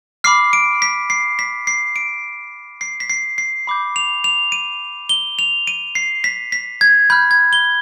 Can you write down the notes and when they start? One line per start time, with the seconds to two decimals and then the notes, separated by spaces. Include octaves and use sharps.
0.24 B5 D6 F6 C7
0.53 D7
0.82 B6
1.10 C7
1.39 B6
1.67 C7
1.96 D7
2.81 C7
3.00 B6
3.10 C7
3.38 C7
3.67 B5 D6 G6
3.96 F7
4.24 F7
4.52 D#7
5.09 G7
5.39 F7
5.67 D#7
5.95 C7
6.24 B6
6.52 B6
6.81 G#6
7.10 B5 F6 G6
7.31 G#6
7.53 G7